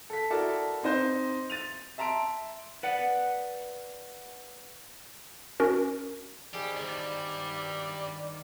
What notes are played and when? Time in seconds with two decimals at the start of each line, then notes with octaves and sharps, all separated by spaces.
0.10 A4 B6
0.30 E4 F#4 A4 A#4 D5 A5
0.83 C4 D#4 C5 G6
1.50 A6 D#7 F7
1.98 E5 A5 A#5 C6 D7
2.83 B4 D5 F#5
5.60 C#4 F#4 A#4
6.54 D#3 G3 G4 G#4 C5
6.77 D2 G2 D5